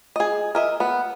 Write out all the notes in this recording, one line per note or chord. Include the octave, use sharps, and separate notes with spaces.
G#4 D#5
A#4 D#5 E5
B3